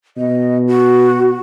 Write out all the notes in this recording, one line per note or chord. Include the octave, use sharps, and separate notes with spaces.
B2 D#5
F#4